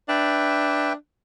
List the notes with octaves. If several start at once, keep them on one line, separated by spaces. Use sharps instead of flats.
D4 B4 E5 G5